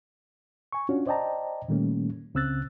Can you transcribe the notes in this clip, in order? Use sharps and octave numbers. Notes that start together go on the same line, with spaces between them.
G#5 C#6
C#4 D4 F4 F#4 C#5
C5 D5 D#5 G5 A5 A#5
A#2 D#3 G3 A3 A#3 C#4
C#2 C#3 C4 E6 F#6 A6